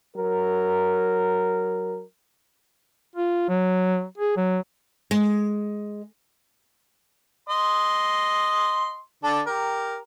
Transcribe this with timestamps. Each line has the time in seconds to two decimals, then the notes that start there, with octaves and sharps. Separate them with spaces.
0.16 F#3 A#4
3.16 F4
3.49 F#3
4.18 G#4
4.37 F#3
5.11 G#3
7.49 D#5 C6
9.24 D3 D4 A4
9.47 G4 A#4